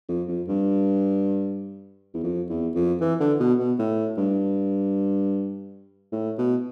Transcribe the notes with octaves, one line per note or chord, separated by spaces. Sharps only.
F2
F2
G2
E2
F2
E2
F2
E3
D3
B2
B2
A2
G2
A2
B2